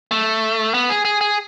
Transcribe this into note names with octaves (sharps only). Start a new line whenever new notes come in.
A3
B3
G#4
G#4
G#4